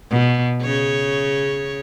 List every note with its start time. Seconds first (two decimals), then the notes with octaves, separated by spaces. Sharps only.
0.11 B2
0.62 C#3 C#5